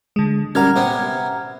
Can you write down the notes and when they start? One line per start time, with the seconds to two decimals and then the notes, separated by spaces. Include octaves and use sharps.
0.16 D3 G#3
0.55 G3 C#4 A#4 F#5 A#5 F6 G#6
0.76 C3 B3 F#5